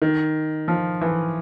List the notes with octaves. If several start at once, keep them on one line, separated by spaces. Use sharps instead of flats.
D#3
F3
E3